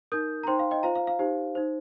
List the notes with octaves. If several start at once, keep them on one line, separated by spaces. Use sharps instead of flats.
D#4 A#4 D#6 G6
A#5
D#4 C5 G5 C6
F5
D#5 G5
F4 C5 F5 A#5
F5
F5
D#4 G4 C5
D#4 C5